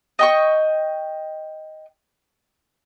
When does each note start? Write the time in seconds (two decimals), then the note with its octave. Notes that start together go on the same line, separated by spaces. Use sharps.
0.19 D#5 G5 C#6